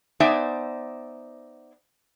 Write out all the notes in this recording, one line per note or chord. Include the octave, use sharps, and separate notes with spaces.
B3 D#4 C5 D5 E5 G#5